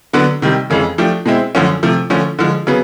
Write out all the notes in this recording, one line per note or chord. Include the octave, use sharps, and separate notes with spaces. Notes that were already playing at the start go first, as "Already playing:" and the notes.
D3 F#3 B3 D4 F#4
C3 D#3 G3
F2 C#3 E3 G#3
F3 A3 D4 G4
B2 G#3 C4 E4
F#2 D3 F3 A3 C#4
C3 F3 A3
D3 F3 A3 C#4
D3 F3 G#3
C#3 F#3 B3